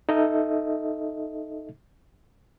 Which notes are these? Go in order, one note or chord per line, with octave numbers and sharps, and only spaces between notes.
D#4 A4 D#5 E5